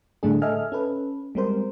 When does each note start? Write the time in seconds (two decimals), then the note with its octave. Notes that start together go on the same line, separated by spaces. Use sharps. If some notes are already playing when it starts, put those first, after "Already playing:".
0.23 A2 D3 G3 A3 D4 G#4
0.42 A4 D#5 E5 G#5 F6
0.72 C#4 A4 B4
1.35 G3 G#3 C4 A#4 C5